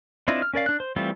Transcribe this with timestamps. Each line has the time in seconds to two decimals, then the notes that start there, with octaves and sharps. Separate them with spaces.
0.28 C4 D4 E4 F4 D#5
0.42 F6
0.54 C#4 A#4 D5 F5
0.66 D4 F#6
0.80 C5
0.96 E3 G3 A3 C4 F4